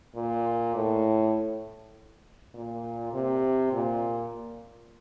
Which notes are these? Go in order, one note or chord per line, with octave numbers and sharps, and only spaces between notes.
A#2
A2
A#2
C3
A#2